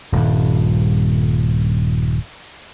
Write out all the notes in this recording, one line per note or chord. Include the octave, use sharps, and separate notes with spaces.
D#1 G2